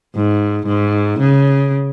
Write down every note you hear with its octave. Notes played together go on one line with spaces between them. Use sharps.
G#2
G#2
C#3